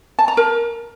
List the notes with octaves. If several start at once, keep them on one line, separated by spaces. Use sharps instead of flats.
A5
A#5
A#4